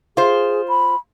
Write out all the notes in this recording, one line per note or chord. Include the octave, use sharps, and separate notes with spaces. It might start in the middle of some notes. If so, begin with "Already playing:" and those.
F4 G#4 C5
B5